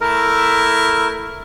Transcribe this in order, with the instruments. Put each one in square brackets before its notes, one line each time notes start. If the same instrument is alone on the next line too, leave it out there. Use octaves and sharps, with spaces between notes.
[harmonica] A3 E4 [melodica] A#4